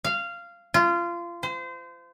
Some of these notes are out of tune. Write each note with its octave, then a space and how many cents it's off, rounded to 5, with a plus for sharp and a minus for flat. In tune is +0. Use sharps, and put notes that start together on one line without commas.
F5 -15
F4 -25
C5 -30